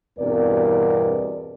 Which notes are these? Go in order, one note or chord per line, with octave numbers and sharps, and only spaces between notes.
E2 G2 B2 C4 A#4 D5